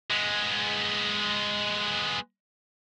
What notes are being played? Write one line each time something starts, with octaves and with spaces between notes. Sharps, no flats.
G#3 B3